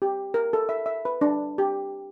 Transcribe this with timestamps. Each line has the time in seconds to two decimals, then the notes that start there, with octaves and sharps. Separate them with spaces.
0.02 G4
0.34 A#4
0.53 A4
0.69 E5
0.86 E5
1.05 B4
1.21 D4
1.58 G4